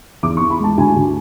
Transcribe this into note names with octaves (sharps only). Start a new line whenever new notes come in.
E2 D6
C#6
E2
B5
G#3 A5
D2 G#5
D2